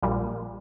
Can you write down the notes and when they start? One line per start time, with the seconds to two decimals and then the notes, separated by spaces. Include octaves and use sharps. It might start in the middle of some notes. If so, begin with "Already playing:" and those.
0.02 A#1 A#2 G3